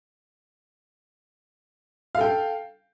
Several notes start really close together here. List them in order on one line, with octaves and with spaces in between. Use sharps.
F5 A4 G5